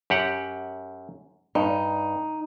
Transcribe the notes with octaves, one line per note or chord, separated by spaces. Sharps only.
F#2 G4 F#5
G2 D#4